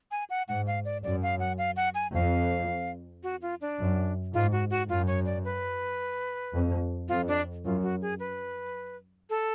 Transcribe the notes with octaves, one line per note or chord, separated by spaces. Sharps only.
G#5
F#5
G#2 F#5
F5
D5
F#2 D5
F5
F#5
F5
F#5
G#5
F2 F5
F#4
F4
D4
F#2
G#2 F4
F#4
F#4
F#2 F4
C#5
D5
B4
F2
F2 F4
D4
F#2 F4
F#4
G#4
B4
A4